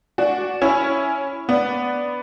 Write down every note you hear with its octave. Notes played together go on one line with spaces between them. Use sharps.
D4 F#4
C#4 E4
B3 D4